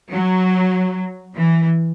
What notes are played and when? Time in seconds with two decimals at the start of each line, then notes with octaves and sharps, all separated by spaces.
0.11 F#3
1.36 E3